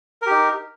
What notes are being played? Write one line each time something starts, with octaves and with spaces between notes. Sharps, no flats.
D#4 G4 A#4